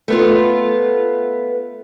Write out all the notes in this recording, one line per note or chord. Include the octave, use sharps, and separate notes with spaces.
A3 B3 F4